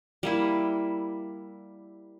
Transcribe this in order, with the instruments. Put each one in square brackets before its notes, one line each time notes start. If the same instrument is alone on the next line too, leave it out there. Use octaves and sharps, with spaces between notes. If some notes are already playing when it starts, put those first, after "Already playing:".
[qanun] G3 A#3 E4